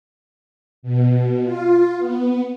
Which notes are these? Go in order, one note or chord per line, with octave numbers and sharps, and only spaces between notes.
B2
F4
B3